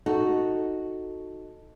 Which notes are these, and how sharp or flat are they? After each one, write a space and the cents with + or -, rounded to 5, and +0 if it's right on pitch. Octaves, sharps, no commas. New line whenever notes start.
D#4 +0 F#4 -5 A4 +0